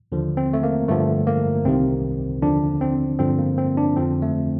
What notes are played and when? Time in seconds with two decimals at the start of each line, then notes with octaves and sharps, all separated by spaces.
0.12 D#2 D3 F3
0.37 C4
0.53 A3
0.63 A#3
0.88 G2 D3 F3 A3
1.27 A#3
1.65 C2 C3 D#3 C4
2.42 D#2 D3 F3 D4
2.81 C4
3.19 G2 D3 F3 C4
3.39 A#3
3.58 C4
3.77 D4
3.96 F2 D3 F3 C4
4.22 A3